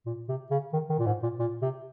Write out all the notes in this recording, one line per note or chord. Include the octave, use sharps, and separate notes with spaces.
A#2
C3
C#3
D#3
D#3
A#2
G#2
A#2
A#2
C3